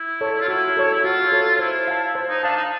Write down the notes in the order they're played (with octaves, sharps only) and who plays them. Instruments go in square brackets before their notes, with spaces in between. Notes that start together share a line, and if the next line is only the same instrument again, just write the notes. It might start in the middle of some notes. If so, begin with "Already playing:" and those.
Already playing: [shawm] E4
[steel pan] A4 C#5
[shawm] F4
[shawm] E4 [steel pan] F#4
[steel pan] A4 C#5
[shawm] E4
[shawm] F4 [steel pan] F#4
[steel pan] A4 C#5
[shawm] E4 [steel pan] C5
[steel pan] F5 A5
C5
[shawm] D#4
[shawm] D4 [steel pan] F5 A5
[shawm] D#4